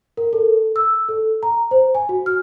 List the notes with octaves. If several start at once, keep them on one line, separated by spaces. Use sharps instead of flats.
A#4
A4
E6
A4
A#5
C5
G#5
F#4
F6